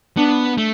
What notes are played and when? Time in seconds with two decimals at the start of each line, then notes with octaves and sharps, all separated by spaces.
0.17 B3 D4
0.58 A3